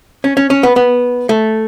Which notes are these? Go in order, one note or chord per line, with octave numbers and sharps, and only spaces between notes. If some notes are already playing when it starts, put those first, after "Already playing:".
C#4
C#4
C#4
B3
B3
A3